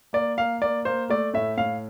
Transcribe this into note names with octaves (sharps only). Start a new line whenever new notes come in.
A#3 D5
A#3 F5
A#3 D5
A#3 C5
A3 D5
A2 E5
A2 F5